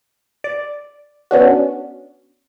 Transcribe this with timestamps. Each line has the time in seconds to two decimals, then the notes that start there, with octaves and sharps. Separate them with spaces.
0.44 D5
1.31 B3 C#4 D4 F#4